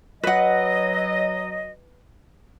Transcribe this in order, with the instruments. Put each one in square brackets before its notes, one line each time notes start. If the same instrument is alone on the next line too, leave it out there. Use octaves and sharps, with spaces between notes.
[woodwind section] F#3 D#5 [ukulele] B4 F#5